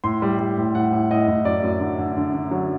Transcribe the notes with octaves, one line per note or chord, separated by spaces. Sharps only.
A2 C6
G3
G3
A2
A2 F#5
A2
A2 D#5
A2
F#2 D5
F#2
D3
D3
D3
D3
F#3